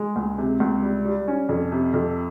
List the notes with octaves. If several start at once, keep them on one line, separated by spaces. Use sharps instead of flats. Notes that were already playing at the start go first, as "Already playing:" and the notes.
Already playing: G#3
C#2
C3
C#2
G3
G3
C#4
F2
C3
F2